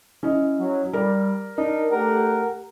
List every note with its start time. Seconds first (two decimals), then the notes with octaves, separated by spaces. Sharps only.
0.23 C#4 E4 D#5
0.59 F#3
0.93 G3 A#4 D5
1.58 D4 D#4 A#4
1.92 A3 G4 A#4 F#5